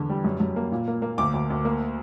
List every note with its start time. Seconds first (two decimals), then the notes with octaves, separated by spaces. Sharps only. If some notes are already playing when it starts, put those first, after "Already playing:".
Already playing: E2 D3
0.09 G3
0.25 F#2
0.40 F#2
0.56 A#3
0.72 A#2
0.88 A#3
1.02 A#3
1.18 D2 D6
1.34 D2
1.50 D2
1.65 A#3